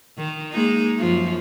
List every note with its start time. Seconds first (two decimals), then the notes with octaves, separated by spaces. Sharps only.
0.17 D#3
0.52 G#3 A#3 D#4
0.99 F#2 F3